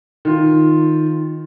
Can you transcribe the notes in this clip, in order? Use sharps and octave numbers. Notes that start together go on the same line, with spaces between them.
D#3 F4